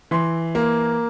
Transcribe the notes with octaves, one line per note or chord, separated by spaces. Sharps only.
E3 C6
A#3